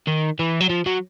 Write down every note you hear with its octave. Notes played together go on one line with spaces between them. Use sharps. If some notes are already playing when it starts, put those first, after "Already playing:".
D#3
E3
F#3
F3
F#3